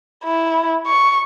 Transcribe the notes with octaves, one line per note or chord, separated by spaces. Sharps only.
E4
C#6